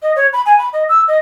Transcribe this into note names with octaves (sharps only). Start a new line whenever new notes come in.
D#5
C#5
B5
G#5
B5
D#5
E6
D#5